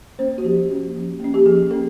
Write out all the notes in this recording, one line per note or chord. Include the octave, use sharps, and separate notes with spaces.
A#3 C#4 C5
F#4
F3 G4
A#3 C#4
F3
A#3 C#4
G4
F3 G#4
A#3 C#4 A4